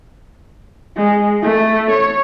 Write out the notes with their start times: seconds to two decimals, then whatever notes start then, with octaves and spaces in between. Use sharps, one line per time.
0.97 G#3
1.42 A3
1.91 C#5